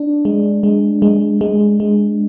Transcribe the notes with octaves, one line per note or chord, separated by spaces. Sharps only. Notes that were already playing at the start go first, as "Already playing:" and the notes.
Already playing: D4
G#3
G#3
G#3
G#3
G#3